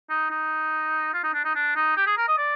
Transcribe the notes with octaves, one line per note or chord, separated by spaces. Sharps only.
D#4
D#4
F4
D#4
D4
D#4
D4
D#4
G4
G#4
A#4
D#5
D5